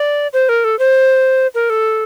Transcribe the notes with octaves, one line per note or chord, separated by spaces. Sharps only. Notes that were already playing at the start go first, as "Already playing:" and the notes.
Already playing: D5
C5
A#4
A4
C5
A#4
A4